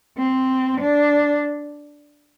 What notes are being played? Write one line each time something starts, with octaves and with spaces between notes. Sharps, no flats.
C4
D4